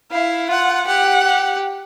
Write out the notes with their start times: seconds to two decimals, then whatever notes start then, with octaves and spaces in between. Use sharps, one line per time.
0.11 E4 F5
0.49 F4 F#5
0.87 G4 F#5
1.24 G4